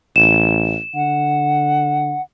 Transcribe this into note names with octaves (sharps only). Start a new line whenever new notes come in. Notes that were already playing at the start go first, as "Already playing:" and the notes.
A1 E7
D3 F#5